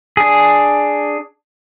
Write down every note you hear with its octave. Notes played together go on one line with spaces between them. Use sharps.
D4 G#4